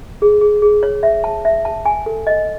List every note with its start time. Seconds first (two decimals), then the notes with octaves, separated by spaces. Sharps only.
0.22 G#4
0.41 G#4
0.62 G#4
0.83 C#5
1.03 E5
1.24 A5
1.45 E5
1.65 A5
1.86 G#5
2.06 A4
2.27 D#5